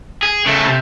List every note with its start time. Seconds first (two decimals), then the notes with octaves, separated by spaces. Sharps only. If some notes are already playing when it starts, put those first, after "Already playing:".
0.23 G#4
0.46 C#3 A3
0.67 C3